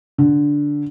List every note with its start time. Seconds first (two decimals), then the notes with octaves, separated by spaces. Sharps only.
0.18 D3